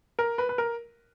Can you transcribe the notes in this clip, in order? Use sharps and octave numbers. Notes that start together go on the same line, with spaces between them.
A#4
B4
B4
A#4